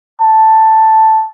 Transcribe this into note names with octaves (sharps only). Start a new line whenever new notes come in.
A5